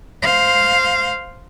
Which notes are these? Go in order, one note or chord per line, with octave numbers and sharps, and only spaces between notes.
C5 F5